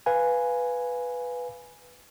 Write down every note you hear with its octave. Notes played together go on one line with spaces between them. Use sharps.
B4 F5 G#5